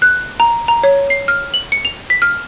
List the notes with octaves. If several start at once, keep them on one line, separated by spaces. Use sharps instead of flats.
F#6
A#5
A#5
C#5
C7
F6
F#7
C#7
F7
B6
F6